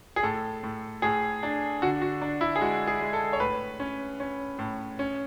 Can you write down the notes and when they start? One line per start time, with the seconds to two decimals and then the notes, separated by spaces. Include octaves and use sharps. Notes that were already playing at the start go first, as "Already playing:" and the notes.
0.16 G#4
0.23 A2 A4
0.63 A2
1.02 A2 G#4
1.43 D4
1.82 D3 F#4
2.02 F#4
2.22 D4
2.41 E4
2.56 G#4
2.61 G#3 F#4
2.87 G#4
3.01 G#3
3.13 A4
3.33 C#5
3.40 A2 B4
3.80 C#4
4.20 C#4
4.59 A2
4.99 C#4